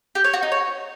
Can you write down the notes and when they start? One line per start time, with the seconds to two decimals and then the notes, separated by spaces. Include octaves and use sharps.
0.15 G4
0.24 C#5
0.33 F#4
0.43 D#4
0.52 C#5